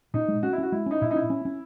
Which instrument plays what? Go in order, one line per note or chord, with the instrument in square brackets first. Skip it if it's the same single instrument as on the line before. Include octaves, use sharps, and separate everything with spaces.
[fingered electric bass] A#2 [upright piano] D#4
[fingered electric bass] G#3
[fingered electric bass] C#4 [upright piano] F#4
[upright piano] E4
[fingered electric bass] C#4 [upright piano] F#4
[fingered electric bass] G#3 [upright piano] E4
[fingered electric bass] C#4 [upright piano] D#4
[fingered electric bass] A#2 [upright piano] E4
[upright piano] D#4
[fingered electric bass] C#4 [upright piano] E4
[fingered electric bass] C#4
C#4